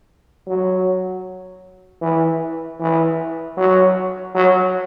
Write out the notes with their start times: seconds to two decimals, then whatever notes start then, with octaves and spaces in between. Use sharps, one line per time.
0.47 F#3
2.02 E3
2.80 E3
3.57 F#3
4.35 F#3